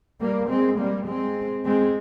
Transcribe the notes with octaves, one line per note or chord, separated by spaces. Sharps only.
G3 A#3
G#3 C4
G3 A#3
G#3 C4
G#3 C4